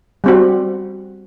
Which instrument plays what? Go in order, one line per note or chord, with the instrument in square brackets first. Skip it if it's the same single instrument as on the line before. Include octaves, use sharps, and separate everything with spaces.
[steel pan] G3 C4 F#4